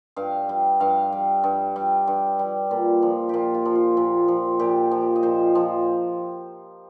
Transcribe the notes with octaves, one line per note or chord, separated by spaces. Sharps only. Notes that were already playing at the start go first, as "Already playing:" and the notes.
G2 F5
G3
G2 F5
G3
G2
G3
G2
G3
A#2
F3
A#2 F4 G4
F4
F3
F4
A#2
F3
A#2 G4
F3
D#5
A#2 C5
F3